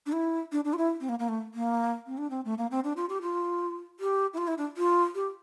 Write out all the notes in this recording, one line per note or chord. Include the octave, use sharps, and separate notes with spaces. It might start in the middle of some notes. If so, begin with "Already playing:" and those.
D4
E4
D4
D4
F4
E4
C4
A#3
A#3
A3
A#3
C4
D4
C4
A3
A#3
C4
D4
F4
G4
F4
G4
E4
F4
E4
D4
F4
G4